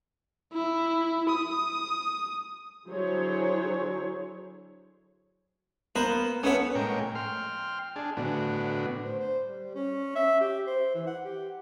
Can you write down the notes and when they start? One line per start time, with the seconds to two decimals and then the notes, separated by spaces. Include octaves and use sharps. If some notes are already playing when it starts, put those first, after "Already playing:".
0.52 E4
1.30 D#6
2.88 D3 F#3 E4 G#4 C5 C#5
5.95 A#3 B3 B4 C5 B5
6.43 A3 B3 C#4 B4 C#5
6.75 A2 G#3 A#3 A#4 C#5 G5
7.15 G5 C6 F6
7.96 D4 G#4 A5
8.17 A2 D3 B3 D4 F#4
9.04 C5
9.20 C5
9.46 G3
9.75 C#4
10.16 E5
10.41 G4
10.67 C5
10.94 E3
11.06 F#5
11.24 G4